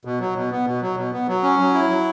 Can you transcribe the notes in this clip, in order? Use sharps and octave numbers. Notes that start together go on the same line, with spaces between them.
B2
F#3
B2
B3
B2
F#3
B2
B3
F#3
C#4
F#3
E4
F#3